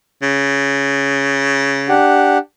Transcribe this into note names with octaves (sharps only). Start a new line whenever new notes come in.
C#3
D4 G4 F#5